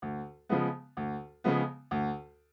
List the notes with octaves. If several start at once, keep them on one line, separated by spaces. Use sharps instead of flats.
D2
C#3 F3 G#3 B3
D2
C#3 F3 G#3 B3
D2